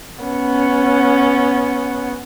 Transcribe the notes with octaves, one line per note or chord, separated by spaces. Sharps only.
B3 C#4